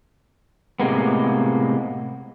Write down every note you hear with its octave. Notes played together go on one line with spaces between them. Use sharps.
A2 C3 G#3 A#3 B3